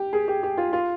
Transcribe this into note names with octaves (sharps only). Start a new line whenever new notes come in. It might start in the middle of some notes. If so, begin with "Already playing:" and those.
Already playing: G4
G#4
G4
G4
F4
F4